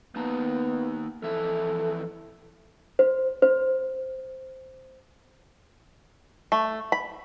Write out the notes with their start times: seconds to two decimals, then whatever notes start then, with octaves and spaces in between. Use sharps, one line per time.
0.16 A#3 B3 D#4 A5
1.23 F2 E3 A4 E5
2.99 C5
3.42 C5
6.52 A3
6.92 B5